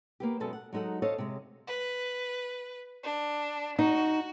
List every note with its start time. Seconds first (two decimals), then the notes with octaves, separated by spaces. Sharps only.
0.20 A#3 B3 G4
0.40 F#2 B2 G#3 A4 A5
0.53 F#5
0.73 F#3 G#3 D#4 A4 F#5
1.02 A4 C5 C#5 D#5 F5
1.18 C3 G#3
1.67 B4
3.04 D4
3.79 D#4 F#4